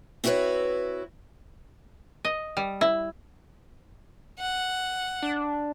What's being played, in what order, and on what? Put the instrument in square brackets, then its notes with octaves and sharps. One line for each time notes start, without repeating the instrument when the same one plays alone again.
[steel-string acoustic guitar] C4 E4 F#4 A#4 B4 C#5
[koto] D#5
G3
E4
[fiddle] F#5
[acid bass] D4